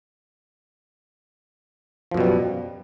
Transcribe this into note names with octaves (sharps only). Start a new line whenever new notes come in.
F#2 B2 F3 G3